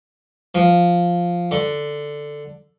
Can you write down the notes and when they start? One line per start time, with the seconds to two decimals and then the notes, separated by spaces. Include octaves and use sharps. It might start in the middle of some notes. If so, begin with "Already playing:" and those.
0.55 F3
1.51 D3